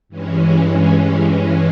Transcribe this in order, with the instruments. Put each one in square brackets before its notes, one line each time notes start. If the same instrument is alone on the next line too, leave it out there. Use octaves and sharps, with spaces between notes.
[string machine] G2 E3 G#3 C#4